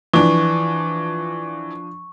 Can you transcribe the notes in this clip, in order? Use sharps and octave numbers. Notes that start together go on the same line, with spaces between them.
E3 F3 D4 C#6